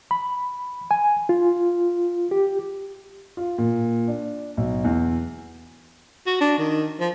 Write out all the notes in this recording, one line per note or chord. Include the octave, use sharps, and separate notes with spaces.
B5
G#5
F4
G4
F4
A#2
D4
B1
E2
F#4
D4
D#3
F3